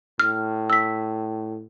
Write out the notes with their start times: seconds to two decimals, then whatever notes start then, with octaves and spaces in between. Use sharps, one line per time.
0.20 A2 F6
0.70 E6 B6